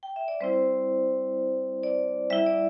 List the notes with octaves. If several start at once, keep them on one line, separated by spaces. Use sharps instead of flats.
G5
E5
D5
G3 C4 E4 C5
D5
G3 E4 E5
D5